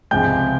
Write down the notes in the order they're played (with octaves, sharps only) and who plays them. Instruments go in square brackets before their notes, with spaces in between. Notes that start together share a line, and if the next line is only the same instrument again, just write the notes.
[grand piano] C#2 C3 F3 G#3 G5 G6